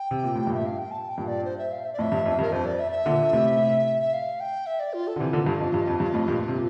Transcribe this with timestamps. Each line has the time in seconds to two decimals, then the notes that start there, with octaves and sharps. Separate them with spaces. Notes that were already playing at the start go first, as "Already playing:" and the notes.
Already playing: G5
0.11 C3
0.24 A#2
0.36 A2
0.47 G2 A#2
0.54 E5
0.66 F5
0.79 G5
0.91 A5
1.09 G5
1.17 G2 A#2
1.27 D5
1.45 C5
1.58 E5
1.72 F5
1.85 E5
1.93 D5
1.98 F2 A2
2.01 E5
2.12 G2
2.26 F2
2.39 G2
2.42 A#4
2.52 F2 C5
2.66 D5
2.79 E5
2.92 E5
3.06 A#2 D3
3.33 A2 C3
4.02 E5
4.13 F5
4.40 G5
4.66 E5
4.80 D5
4.94 F4
5.07 A4
5.16 D3
5.20 C3 E3 F4
5.33 A#2 D3
5.47 G2
5.60 F2
5.74 G2
5.87 F2
6.00 G2
6.14 F2 A2
6.28 G2 A#2
6.48 C3
6.54 A#2